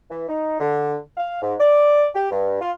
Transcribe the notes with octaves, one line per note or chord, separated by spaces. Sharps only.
E3
D#4
D3
F5
G#2
D5
G4
G2
F4